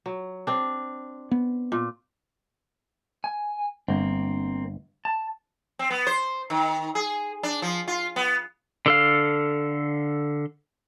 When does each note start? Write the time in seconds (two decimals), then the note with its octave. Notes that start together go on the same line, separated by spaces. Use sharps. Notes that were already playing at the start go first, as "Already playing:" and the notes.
0.06 F#3
0.47 C4 D4
1.31 B3
1.72 A#2
3.24 G#5
3.88 G1 A#3 C4
5.05 A5
5.79 C4
5.90 B3
6.07 C5
6.50 D#3
6.95 G#4
7.43 D4
7.62 F3
7.88 F4
8.16 B3
8.86 D3 A4 F5